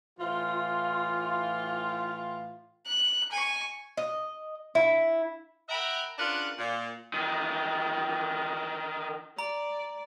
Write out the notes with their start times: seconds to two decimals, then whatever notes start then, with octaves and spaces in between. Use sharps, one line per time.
0.19 A2 E3 F4
2.87 F#6
3.31 G#5 C#6
3.97 D#5
4.75 E4
5.69 A#4 E5 F#5 G5 A#5 B5
6.18 C#3 D4 F4 A#4 B4 F#5
6.58 A#2
7.13 D#3 E3
9.39 D5 A#5